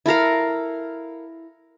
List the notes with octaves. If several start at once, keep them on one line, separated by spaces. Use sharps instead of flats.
E4 A4 A#4 F5